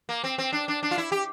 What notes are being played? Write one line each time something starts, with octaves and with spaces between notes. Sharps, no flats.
A#3
C4
C4
D4
D4
D4
F4
E4
G4